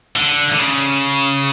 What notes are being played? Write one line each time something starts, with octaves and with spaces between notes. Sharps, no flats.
D3
D3
C#3